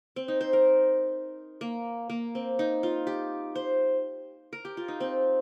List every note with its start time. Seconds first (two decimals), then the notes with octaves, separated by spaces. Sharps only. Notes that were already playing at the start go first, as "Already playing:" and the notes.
0.16 C4
0.28 D#4
0.41 C5
0.53 A#4
1.61 A#3
2.10 A#3
2.35 C4
2.59 D#4
2.83 F4
3.07 G4
3.55 C5
4.53 A#4
4.65 G4
4.77 F4
4.88 D#4
5.00 C4